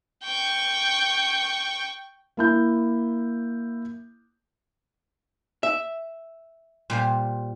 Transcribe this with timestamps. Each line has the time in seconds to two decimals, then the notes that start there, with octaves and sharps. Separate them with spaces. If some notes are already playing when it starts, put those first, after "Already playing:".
0.24 G5 C#6
2.37 A#3 E4 G6
5.63 E5
6.90 A#2 G3 C5